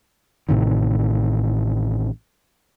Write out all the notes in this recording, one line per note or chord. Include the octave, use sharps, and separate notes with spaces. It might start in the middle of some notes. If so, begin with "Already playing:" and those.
A1 A2 C3 D#3